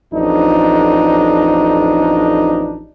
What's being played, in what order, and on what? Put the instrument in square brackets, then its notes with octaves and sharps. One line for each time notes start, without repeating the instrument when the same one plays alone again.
[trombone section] A1 F2 D4 D#4